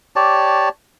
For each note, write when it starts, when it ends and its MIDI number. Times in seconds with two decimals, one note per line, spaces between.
0.16 0.69 67
0.16 0.69 73
0.16 0.69 74
0.16 0.69 81